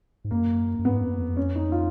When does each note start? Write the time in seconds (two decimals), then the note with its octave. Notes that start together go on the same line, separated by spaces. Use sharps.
0.25 G#2
0.31 F#2 A#3
0.79 F#2
0.84 G#2 B3
1.01 F#2
1.19 F2
1.37 C#4
1.55 D#4
1.72 F4